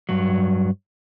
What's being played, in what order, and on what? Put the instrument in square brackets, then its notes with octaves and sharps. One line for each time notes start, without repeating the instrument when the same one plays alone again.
[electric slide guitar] G2 F#3